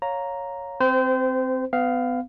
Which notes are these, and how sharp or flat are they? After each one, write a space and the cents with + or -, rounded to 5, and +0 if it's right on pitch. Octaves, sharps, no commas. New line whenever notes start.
C#5 +0 F5 +20 A#5 +0
C4 -5 C5 -30
B3 +35 F5 +0